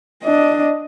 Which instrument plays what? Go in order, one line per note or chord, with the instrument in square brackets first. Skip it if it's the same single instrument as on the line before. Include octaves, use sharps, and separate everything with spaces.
[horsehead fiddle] D4 D#5